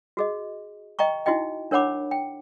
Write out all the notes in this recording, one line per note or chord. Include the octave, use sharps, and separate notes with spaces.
F#4 G#4 D#5
D#5 G5 A#5 C#6
D#4 E4 F#4 D#5 G5
D4 A#4 C#5 F#5 B5 D6
G5